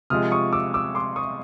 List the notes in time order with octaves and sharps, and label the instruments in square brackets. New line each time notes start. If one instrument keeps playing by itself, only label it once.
[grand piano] C3 F3 G#3 D#6 F6
C#6 D#6
D6 E6
D6 E6
C6 D6
C#6 D#6